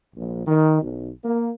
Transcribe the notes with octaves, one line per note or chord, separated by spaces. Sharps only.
A#1
D#3
B1
A#3